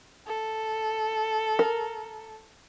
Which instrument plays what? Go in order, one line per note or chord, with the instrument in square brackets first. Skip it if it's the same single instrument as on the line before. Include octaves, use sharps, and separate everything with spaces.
[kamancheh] A4
[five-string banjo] A#4